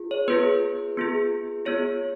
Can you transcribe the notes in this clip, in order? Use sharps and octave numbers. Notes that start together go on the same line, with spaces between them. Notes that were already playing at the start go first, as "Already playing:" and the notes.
Already playing: F4 G#4
C#5
B3 F4 G#4 B4
B3 F4 G#4
B3 F4 G#4 C#5